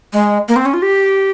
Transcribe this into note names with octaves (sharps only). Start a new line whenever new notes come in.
G#3
A#3
C4
C#4
F4
G4